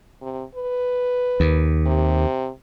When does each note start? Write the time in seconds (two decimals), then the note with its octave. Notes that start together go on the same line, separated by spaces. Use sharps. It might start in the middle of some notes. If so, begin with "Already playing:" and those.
0.22 C3
0.55 B4
1.40 D#2
1.86 C3